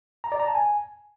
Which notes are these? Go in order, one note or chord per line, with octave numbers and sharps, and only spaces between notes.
A#5
D5
A#5
A5
G#5